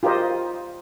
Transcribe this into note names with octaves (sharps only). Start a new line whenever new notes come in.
F4 G4 A#4 C5 D#5